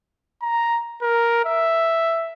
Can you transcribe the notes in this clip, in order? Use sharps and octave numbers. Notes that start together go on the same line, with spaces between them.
A#5
A#4
E5